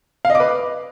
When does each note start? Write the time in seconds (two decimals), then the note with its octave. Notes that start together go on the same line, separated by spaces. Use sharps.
0.25 F5
0.30 D#5
0.35 D6
0.40 B4